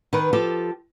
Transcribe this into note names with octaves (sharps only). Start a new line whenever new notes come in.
D#3 B4
F3 G4 A4